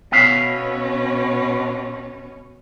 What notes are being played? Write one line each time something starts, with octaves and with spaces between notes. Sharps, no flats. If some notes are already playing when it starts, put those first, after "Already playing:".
B2 B3 C#4 E5 F5